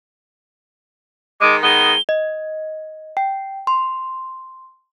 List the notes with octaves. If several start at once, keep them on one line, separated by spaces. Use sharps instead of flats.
D#3 G#3 D6
D#3 G#3 B3 G7
D#5
G5
C6